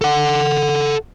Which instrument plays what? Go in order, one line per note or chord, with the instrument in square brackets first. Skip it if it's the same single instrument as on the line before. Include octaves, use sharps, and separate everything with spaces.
[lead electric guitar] A4 F#5